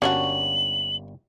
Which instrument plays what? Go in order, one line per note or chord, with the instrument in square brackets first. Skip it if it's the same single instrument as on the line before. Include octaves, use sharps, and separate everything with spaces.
[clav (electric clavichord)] G1 G3 A#3 [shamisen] C#4 D4 F#4 [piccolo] F#7